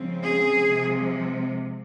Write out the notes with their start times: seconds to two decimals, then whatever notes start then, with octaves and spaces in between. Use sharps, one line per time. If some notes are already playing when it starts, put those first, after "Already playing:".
Already playing: C#3 F3 G#3 C4
0.23 G#4
0.65 C3 F3 G#3